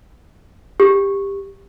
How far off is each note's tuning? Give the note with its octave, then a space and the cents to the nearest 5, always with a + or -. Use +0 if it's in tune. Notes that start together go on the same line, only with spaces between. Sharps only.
G4 +15